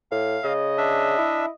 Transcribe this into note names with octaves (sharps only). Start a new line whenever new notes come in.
A2 F5
C#3 D#5
D4 E5
E4